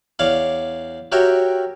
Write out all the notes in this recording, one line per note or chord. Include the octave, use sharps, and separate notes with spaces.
E2 C#5 D5 F5 D6
F#4 G4 A#4 C#5 E5 G5